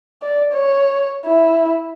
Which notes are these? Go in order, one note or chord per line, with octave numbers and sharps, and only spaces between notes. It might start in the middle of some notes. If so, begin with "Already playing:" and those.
D5
C#5
E4